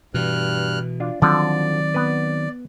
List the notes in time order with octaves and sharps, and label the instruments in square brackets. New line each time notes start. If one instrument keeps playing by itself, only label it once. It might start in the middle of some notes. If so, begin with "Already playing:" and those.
[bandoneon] G2 F6 F#6 [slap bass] B2 E3
[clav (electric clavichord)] D4 F4
[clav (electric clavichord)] D3 F3 [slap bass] D#3 F#3 C4 [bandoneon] D5
[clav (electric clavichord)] B3 B4